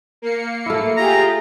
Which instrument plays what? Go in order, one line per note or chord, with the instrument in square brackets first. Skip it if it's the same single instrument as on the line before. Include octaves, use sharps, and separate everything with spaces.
[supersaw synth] A#3 C7 C#7
[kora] A3 E4
[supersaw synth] F4 G4 G#4 [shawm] A#5